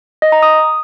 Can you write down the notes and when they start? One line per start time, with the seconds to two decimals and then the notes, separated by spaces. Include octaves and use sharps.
0.22 D#5
0.32 A#5
0.43 D#6